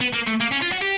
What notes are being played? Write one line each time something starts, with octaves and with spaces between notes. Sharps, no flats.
B3
A#3
A3
A#3
C#4
F4
F#4
G4